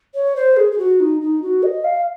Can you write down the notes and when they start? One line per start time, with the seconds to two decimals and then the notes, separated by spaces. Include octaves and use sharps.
0.15 C#5
0.36 C5
0.57 G#4
0.72 G#4
0.78 F#4
1.00 D#4
1.21 D#4
1.42 F#4
1.63 D#5
1.84 F5